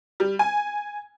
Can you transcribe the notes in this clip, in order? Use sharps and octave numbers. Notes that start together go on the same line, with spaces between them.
G3
G#5